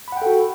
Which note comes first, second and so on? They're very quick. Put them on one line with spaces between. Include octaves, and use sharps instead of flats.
B5 F#5 G5 A4 F#4